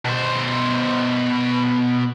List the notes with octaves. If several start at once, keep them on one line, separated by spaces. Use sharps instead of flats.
B2 C5